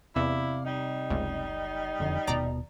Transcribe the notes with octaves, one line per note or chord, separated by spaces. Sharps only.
E2 C3 E4 D5 F5
G3 D#4
F#1 C#2
E1 F2 D3
D#1 D#2 B2 D5 A#5